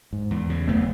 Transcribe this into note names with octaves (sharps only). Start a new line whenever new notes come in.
G#2
E2
C#3
F#1 A3 B3